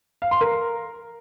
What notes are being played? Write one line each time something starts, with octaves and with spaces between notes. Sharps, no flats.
F5
C6
A#4